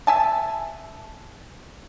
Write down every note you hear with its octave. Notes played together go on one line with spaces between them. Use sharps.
E5 G#5 A5